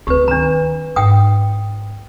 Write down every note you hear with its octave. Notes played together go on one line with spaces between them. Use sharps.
D2 C4 G4 B4
D#3 D4 A#5
G#2 F#5 G5 D#6